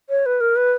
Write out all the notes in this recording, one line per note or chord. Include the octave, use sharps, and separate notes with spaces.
C#5
B4
A#4
B4